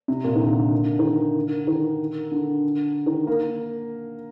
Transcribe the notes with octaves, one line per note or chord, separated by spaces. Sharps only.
C3
A#2
D#3
D3
D#3
D3
D#3
D3
D#3
A#3